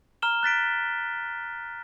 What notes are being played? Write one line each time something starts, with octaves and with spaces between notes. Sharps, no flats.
A#5 F6 E7 G7
F#6 A6 B6 D7